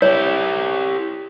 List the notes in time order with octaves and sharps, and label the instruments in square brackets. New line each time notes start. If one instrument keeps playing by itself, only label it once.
[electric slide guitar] E4 G4 [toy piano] C#5